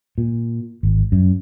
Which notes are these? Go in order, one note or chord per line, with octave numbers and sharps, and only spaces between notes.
A#2
G#1
F#2